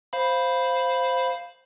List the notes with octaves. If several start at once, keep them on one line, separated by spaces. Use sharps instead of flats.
C5 F5 B5